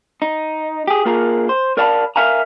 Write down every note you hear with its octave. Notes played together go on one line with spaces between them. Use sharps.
D#4
G4 G#4
A#3 F4 G#4 A#4
C5
A#4 D5 F5 A5 B5
A#4 E5 F5 G#5 A#5